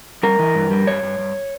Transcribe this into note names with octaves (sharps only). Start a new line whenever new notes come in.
G3 A#4
E3
G2
G3
G2 C#5
G2
G2